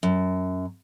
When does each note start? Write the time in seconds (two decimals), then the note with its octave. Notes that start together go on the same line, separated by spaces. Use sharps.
0.03 F#2